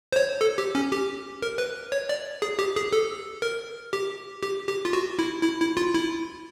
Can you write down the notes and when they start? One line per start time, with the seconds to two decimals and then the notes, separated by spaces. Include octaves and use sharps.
0.12 C5
0.16 C#5
0.41 A4
0.58 G4
0.75 C#4
0.92 G4
1.42 A#4
1.58 B4
1.92 C#5
2.09 D5
2.42 G#4
2.59 G4
2.76 G#4
2.92 A4
3.42 A#4
3.93 G4
4.43 G4
4.68 G4
4.85 F4
4.93 F#4
5.19 E4
5.43 E4
5.60 E4
5.77 F4
5.94 E4